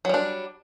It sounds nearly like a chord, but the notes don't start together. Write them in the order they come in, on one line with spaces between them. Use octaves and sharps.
F#3 G3 D4